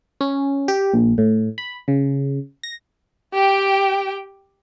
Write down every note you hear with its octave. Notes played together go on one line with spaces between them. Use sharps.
C#4
G4
A#1
A2
B5
C#3
A#6
G4 G5